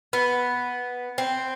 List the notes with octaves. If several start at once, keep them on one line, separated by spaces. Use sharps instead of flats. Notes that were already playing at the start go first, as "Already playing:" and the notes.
B3
C4